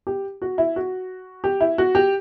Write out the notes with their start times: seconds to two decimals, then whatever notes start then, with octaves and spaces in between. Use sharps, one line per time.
0.07 G4
0.42 F#4
0.58 E4
0.76 F#4
1.44 G4
1.61 E4
1.78 F#4
1.95 G4